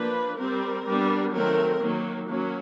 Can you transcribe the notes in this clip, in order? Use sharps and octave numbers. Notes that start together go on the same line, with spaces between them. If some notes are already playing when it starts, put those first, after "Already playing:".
Already playing: F3 A#3 D4 B4
G3 C4 A#4
G3 B3 D4
D#3 F#3 A3 C4 A#4
D#3 F#3 A#3
F#3 A#3 C#4